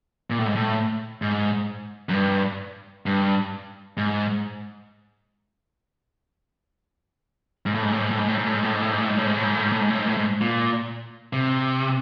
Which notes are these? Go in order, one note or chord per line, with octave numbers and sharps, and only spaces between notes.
A#2
A2
G#2
A2
G#2
F#2
G2
G2
G#2
G#2
A2
G#2
A2
G#2
A2
G#2
A2
G#2
A2
G#2
A2
G#2
A2
G#2
A2
G#2
A2
G#2
A2
G#2
A2
G#2
A2
G#2
A2
G#2
A2
G#2
A#2
C3